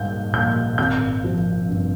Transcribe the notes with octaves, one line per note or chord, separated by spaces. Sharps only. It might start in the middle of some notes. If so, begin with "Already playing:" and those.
Already playing: A#1 G#2 G3 G6
A#1 G6
G#1 G6
F3
G2